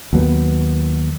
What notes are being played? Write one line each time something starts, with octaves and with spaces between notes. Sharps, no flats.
D#2 F#3 A#3 B3